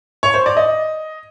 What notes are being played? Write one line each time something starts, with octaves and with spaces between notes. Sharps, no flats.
C#5
C5
D5
D#5